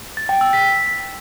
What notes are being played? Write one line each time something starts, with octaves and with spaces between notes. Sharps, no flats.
A6
G5
E6
B6